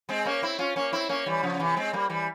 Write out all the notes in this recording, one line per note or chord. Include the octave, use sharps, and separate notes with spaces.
G#3 C4
A#3 C#4
C4 E4
C#4 F4
A#3 C#4
C4 E4
A#3 C#4
E3 G3
C#3 F3
C3 E3
G#3 C4
G3 A#3
E3 G3